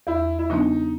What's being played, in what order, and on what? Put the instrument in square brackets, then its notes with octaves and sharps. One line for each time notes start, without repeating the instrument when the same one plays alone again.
[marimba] E2 [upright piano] E4
[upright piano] E4
[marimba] C#3 F#3 B3 D4 [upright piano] D#4